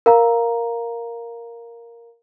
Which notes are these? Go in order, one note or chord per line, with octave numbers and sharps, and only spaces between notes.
A#4 F5 A#5